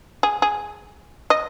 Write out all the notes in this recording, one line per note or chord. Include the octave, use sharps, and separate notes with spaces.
G#4
G#4
D#5